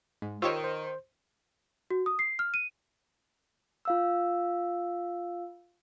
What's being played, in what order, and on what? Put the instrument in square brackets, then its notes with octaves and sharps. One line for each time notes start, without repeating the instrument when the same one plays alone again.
[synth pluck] G#2 [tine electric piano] G#3
[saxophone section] D#3 [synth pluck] F4 G4 C#5 [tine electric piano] C5 C#6 E6
[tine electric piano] C5
[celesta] F#4
D#6
C7
F6
D#7
[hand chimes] F4 F5 E6